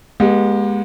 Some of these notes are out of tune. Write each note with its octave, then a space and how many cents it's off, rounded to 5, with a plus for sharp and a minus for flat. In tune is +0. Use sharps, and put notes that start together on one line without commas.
G#3 +0 B3 -45 G4 +0